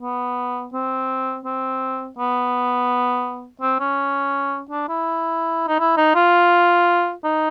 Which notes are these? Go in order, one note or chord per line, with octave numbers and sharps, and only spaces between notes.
B3
C4
C4
B3
C4
C#4
D4
E4
D#4
E4
D#4
F4
D#4